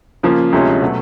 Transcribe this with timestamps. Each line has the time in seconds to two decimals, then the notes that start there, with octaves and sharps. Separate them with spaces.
0.23 C#3 F3 A#3
0.53 D2 C3 F3 G#3 C#4
0.82 B2 F#3 A3